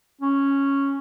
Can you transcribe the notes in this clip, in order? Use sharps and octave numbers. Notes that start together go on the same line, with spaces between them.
C#4